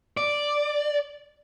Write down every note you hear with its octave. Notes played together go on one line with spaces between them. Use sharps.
D5